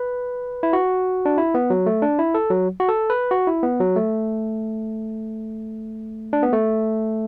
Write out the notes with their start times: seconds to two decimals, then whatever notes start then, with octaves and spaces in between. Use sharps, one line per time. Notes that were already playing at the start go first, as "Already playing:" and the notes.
Already playing: B4
0.63 E4
0.73 F#4
1.26 D4
1.38 E4
1.55 B3
1.70 F#3
1.86 A3
2.02 D4
2.19 E4
2.34 A4
2.50 F#3
2.80 F#4
2.89 A4
3.10 B4
3.31 F#4
3.47 E4
3.63 B3
3.80 F#3
3.96 A3
6.33 D4
6.43 B3
6.53 A3